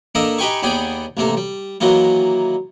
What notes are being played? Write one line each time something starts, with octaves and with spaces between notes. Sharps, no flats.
A#3 D4 A4 A#4 D#5 E5
D#4 G4 B4 G5 G#5 C#6
D#2 B3 G#4 D5 G5 G#5
A1 C3 A#3 A4
G3
D#3 E3 F#3 A#3 F4